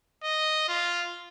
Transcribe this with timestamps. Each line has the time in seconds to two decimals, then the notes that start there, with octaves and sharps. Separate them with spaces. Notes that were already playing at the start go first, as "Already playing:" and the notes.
0.24 D#5
0.69 F4